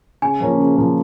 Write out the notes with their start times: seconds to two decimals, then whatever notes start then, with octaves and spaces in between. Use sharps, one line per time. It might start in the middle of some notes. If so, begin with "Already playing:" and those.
0.22 C#3 G#5
0.40 F3 A#3 C#4
0.58 C#3
0.76 F3 A#3 C#4